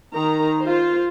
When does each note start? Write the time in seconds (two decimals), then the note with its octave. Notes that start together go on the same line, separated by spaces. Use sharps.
0.13 D#3 A#4 A#5
0.60 F4 C5